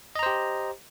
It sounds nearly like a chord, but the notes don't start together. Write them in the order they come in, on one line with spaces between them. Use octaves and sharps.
D#5 A#5 C5 G4